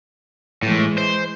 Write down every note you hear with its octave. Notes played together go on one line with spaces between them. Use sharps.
A2 E3 G#3
C5